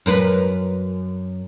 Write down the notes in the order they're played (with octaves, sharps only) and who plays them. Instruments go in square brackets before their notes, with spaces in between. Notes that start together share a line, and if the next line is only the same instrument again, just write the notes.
[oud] F#2 A#4 B4